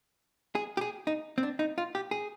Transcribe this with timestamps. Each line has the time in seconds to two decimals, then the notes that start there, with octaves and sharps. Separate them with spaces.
0.55 G#4
0.77 G4
0.81 G#4
1.07 D#4
1.38 C4
1.43 D4
1.59 D#4
1.78 F4
1.95 G4
2.11 G#4